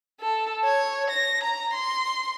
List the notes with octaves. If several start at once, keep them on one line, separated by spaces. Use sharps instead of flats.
A4
C#5
A#6
A#5
C6